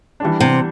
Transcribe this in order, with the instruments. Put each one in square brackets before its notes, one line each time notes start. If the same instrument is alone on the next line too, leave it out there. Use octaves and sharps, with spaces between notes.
[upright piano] E3 G3 D4
[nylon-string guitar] C3